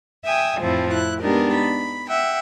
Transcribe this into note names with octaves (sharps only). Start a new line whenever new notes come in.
E5 G5 G#5 D#6
F2 A2 F3 A3 C4 E4
E4 F#6
G#3 B3 D4 D#4 G4 A#4
B5
E5 F#5 G5